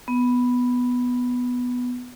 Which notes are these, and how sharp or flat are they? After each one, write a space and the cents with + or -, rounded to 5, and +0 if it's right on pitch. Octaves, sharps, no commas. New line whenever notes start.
B3 +0